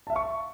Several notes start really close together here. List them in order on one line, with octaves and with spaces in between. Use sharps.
A5 E5 F5 C#6